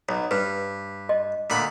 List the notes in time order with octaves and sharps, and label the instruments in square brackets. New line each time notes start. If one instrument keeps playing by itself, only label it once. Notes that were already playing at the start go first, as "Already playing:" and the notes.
[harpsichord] B1 [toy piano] C#5
[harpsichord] G2 [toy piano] B4
[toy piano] D#5
[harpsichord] D2 A#2 B5